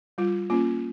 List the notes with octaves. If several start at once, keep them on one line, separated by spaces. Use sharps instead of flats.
G3 F4
A#3 C#4 F4